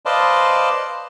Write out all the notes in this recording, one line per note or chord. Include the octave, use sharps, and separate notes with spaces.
B4 C5 D5 D#5 F5 A5